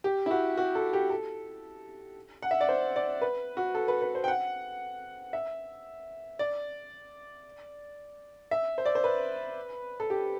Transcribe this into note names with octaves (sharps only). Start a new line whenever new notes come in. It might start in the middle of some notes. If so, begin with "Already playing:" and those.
G4
E4
F#4
F#4
A4
G4
A4
F#5
E5
D5
C5
D5
B4
F#4
A4
B4
B4
C5
G5
F#5
E5
D5
E5
C5
D5
C5
B4
A4
G4